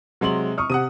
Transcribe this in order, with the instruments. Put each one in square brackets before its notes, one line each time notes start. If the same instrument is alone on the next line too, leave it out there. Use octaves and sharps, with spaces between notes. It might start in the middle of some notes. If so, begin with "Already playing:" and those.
[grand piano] C3 G#3 C6 [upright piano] F#3 F#7
[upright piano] C#6 D#6 F6
[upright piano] C3 [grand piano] F#5 D#6 D#7